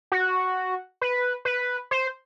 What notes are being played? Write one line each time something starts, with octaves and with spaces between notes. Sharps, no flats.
F#4
B4
B4
C5